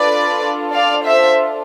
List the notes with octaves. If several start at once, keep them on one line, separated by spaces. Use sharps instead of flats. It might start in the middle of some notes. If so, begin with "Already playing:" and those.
Already playing: D4 F4 A4 B4 D5
D5 F5
C5 E5